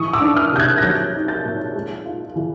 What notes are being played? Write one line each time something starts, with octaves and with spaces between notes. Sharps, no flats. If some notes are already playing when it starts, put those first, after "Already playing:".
Already playing: E3 C#6 D#6
D6 E6
D4
D#6 F6
C3 G6
F#6 G#6
A#6
F#3 G6 A6
D#4
G6 A6
A#2
G#3
F4
E3